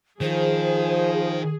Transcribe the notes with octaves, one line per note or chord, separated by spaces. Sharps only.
D#3 F3 G#4 C5